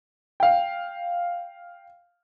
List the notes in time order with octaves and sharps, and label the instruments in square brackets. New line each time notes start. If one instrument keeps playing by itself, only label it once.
[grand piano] F5 G5